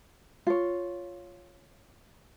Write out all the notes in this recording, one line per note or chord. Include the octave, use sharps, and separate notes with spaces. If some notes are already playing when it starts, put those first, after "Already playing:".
F4 C#5